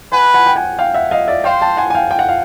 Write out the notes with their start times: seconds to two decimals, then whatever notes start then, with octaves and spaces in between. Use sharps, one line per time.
0.12 B4 F#5 G#5
0.34 F#5 G#5
0.46 G5
0.56 F#5 G#5
0.79 F5 G5
0.94 E5 F#5
1.11 D#5 F5
1.28 D5 E5
1.44 C5 F5 G5
1.61 G5 A5
1.77 F#5 G#5
1.90 G#5
1.94 F5 G5
2.11 G5
2.19 F#5
2.29 F5